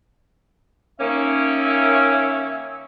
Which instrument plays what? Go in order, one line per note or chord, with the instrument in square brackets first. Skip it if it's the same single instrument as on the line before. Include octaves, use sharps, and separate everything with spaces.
[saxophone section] D#3 A#3 C#4 [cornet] E5